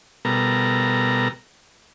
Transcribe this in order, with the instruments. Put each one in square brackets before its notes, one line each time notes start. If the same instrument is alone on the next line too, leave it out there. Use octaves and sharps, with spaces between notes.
[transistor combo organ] B2 G3 B3 A4 A#4 A#5